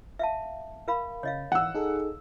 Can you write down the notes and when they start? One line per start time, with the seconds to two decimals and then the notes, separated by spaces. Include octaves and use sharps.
0.19 E5 F5 A5
0.88 A#4 F5 B5
1.23 C#3 C#5 D#5 F5
1.52 G#1 E3 F#5 E6
1.74 D#4 G#4 A4